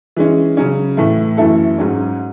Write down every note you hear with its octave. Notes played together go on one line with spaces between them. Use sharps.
E3 G#3 C#4
C#3 F#3 C#4
A2 E3 A3 E4
F#2 E3 A3 E4 A4
G#2 F#3 C#4